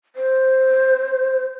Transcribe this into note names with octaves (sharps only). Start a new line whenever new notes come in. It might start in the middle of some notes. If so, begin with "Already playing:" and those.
C5